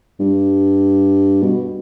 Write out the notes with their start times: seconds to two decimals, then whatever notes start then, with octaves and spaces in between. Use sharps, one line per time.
0.19 G2
1.43 B2